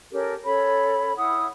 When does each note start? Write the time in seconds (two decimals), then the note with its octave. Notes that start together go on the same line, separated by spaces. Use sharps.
0.11 C#4 G4 A4 A#4
0.45 C#4 A4 C#5 B5
1.16 E4 F#5 D#6